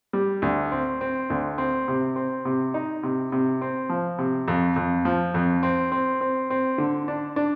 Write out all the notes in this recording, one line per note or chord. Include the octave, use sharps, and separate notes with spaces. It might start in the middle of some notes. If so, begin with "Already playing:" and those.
G3
D2
C4
C4
D2
C4
C3
C4
C3
D#4
C3
C3
C4
F3
C3
F2
F2
F3
F2
C4
C4
C4
C4
D3
D4
D4